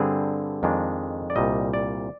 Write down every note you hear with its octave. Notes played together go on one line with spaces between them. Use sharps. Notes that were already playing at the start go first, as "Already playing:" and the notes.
Already playing: G2 D3 G3 C4 G#4
F2 D#3 G#3 D4
D5
C2 A#2 G3 D#5
D5